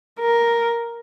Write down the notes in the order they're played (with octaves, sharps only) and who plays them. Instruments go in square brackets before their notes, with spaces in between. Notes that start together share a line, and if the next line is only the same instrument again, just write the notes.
[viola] A#4